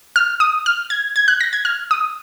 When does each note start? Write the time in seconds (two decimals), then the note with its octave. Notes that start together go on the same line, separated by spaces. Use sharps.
0.16 F6
0.40 D#6
0.66 F6
0.90 G#6
1.16 G#6
1.28 F#6
1.41 A#6
1.53 G#6
1.65 F6
1.91 D#6